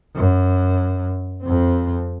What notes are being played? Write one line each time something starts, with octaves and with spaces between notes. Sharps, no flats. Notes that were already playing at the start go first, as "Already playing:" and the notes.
F#2
F2 C4